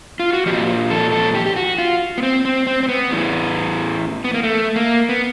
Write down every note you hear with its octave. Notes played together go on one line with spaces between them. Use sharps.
F4
F#4
A#2 F3 G4
A4
A4
G4
G4
F#4
F4
B3
C4
C4
C4
C4
B3
A2 E3
B3
A#3
A3
A#3
B3